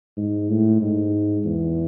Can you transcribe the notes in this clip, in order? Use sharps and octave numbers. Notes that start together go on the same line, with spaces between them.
G#2
A2
G#2
E2